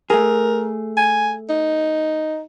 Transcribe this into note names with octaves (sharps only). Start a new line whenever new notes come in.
A3 G#4 A#4
G#5
D#4